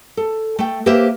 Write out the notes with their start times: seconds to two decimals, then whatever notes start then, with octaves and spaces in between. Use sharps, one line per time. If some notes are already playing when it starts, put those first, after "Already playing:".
0.17 A4
0.59 A3 G5
0.86 A#3 G4 B4 C5 E5